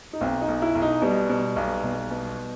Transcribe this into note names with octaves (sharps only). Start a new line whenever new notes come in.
D#4
B1 C4
D#4
B1
E4
B1
D#4
B2 G3
B2
B1
B1
B2